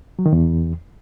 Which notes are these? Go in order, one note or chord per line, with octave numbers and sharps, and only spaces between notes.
F#3
D#3
E2